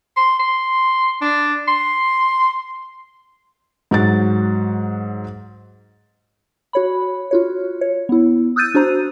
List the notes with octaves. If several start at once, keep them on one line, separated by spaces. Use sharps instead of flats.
C6
C6
D4
C6
G#2 F#3 F#4 A6
F#4 C#5 B5
F4 F#4 C#5
C#5
B3 E4
D#6 E6 F#6 G6 A6 D#7
D4 F#4 C5 A#5